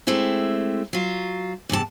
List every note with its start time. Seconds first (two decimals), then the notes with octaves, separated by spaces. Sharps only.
0.07 G#3 A3 C4 E4 G4
0.93 F#3 F4
1.69 E2 G2 C3 A5